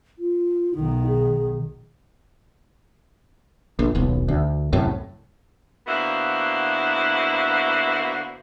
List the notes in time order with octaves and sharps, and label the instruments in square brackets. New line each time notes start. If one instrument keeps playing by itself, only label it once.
[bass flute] F4
[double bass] B1 D#3 [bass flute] D#4
[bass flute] G#4
[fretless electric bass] A#1
D#1 B1
D2
C2 F#2 A2
[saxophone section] D3 A#3 B3 E4 F#4 C5